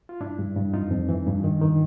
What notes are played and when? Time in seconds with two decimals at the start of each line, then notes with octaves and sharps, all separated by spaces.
0.09 F4
0.20 G2 D4 E4
0.38 G2
0.56 G2
0.73 F2 D#4 F4
0.91 F2
1.09 E3
1.27 G2
1.44 D#3
1.61 D#3